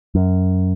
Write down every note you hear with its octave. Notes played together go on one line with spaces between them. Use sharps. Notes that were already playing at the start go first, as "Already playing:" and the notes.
F#2